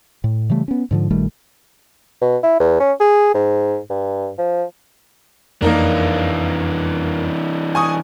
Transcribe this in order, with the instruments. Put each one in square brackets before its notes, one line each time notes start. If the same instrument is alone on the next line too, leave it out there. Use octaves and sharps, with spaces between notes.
[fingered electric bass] A2
C#3 E3 G3 A3
B3 C#4
G#2 D3 F3
A#1 D#3 G3 A3
[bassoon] B2
E4
E2
C#4
G#4
G#2
G2
F3
[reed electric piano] F2 [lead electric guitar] E3 D4 [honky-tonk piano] A#3 D#4 A#4
[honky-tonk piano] G#5 C#6 D#6